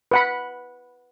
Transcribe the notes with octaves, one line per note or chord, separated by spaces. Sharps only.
B4 F#5 B5